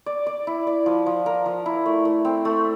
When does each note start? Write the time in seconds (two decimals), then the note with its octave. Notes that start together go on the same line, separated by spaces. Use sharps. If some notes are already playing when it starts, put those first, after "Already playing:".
0.06 D5
0.26 D5
0.47 E4
0.67 D5
0.86 F3
1.06 F3
1.26 A#4
1.46 F3
1.66 E4
1.86 A3
2.05 A3
2.25 C4
2.45 A3